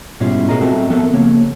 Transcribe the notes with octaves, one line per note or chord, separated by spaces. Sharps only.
G#2 B2 G3 C#4 E4 F4
A2 G#4 A#4 D#5 A#5
C4 F#4 A4 E5 A5
F3 B3 A4 A#4 E5 A5
C#2 A#3 C#5